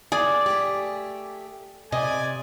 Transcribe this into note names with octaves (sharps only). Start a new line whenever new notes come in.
G#4 D5
A3 G4
C3 D5 D#5 G#5